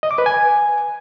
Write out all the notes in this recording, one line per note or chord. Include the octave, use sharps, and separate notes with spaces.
D#5
D6
B4
G#5